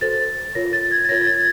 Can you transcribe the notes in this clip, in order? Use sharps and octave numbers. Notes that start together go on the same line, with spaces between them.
F#4 A4 C5 A6
F4 A#4 C#5 A#6
A6
G#6
A6
F4 A#4 C#5 A#6
G#6
A6